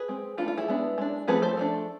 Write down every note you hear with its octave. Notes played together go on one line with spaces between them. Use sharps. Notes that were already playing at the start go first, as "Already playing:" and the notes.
Already playing: G#4 B4
G#3 C4
E3 A3 D4 F4
F4
E4 G#4
G#3 B3 D4
G#3 D4
F3 A3 C4 G#4 B4
A4 C5
F3 A3 D4